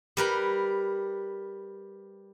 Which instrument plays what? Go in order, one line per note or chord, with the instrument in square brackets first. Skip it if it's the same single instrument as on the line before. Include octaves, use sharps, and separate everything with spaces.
[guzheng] G3 A#4 B4